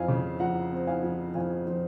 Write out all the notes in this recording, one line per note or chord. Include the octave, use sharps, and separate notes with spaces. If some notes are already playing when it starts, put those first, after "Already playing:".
Already playing: F2 C4 F5 G#5
C#3
F3 F#5 A#5
C4
F5 G#5
F3
F2 F5 G#5
F3 C5